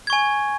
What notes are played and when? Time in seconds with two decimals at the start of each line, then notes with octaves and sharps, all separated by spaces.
0.07 G#6
0.10 C#6
0.13 G#5